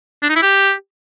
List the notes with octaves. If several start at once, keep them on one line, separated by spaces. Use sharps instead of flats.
D4
D#4
E4
G4